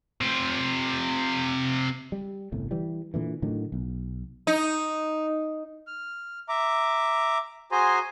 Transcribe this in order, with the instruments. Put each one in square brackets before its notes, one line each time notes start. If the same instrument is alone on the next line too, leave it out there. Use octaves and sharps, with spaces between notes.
[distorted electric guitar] C3 F4
[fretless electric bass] G3
G1 C2 A2
E3 G3
A#2 D3 E3
A2 D3 D#3 F#3
B1
[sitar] D#4
[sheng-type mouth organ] F6
E5 A#5 D6
F#4 G#4 C5 G#5 A#5 C6